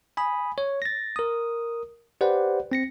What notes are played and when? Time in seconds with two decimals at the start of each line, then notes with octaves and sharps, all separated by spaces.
0.17 G#5 B5 D#6
0.58 C#5
0.82 A6 A#6
1.16 A#4 D#6
2.21 G4 B4 C5 D5 F#5
2.72 C4 A#6 C#7